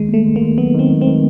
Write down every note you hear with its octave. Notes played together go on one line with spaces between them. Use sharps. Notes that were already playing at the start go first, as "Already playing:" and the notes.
Already playing: D#3 G#3
A3 A#3
D#3
A#3
D#3
F#3 B3
D#3
C4
D#3
C4
D#3